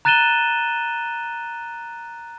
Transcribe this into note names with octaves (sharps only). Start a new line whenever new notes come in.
A#5 F#6 A6 D#7 E7 G7